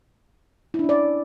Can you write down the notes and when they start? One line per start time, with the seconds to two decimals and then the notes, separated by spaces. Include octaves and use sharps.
0.74 E4
0.79 D4
0.84 C#4
0.89 D5